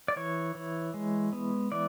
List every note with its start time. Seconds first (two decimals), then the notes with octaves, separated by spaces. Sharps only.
0.08 D5
0.16 E3 C#5
0.55 E3
0.94 G#3
1.33 B3
1.72 E3 D5